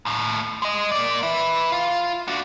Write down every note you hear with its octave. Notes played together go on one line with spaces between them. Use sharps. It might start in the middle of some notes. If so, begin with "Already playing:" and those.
D#2 A2
G#3 D#5
A#3 D5
B4 E5
F4
D4 F#4